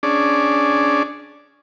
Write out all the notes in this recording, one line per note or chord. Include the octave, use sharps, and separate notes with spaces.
C#4 D4 G#4 D5